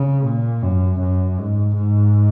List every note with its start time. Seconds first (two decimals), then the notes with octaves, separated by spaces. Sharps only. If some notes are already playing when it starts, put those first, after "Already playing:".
Already playing: C#3
0.24 A#2
0.62 F#2
1.01 F#2
1.38 G#2
1.76 G#2